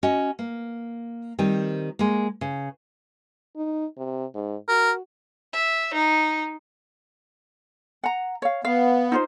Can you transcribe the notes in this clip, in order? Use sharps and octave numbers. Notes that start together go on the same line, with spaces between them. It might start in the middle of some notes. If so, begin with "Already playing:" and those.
C#4 F#4 D#5
A#3
D#3 G3 C4
G#3 A#3
C#3
D#4
C3
G#2
F#4 A#4
E5
D#4
F#5 A#5
C#5 F5
B3 F5
D#4 F4 C5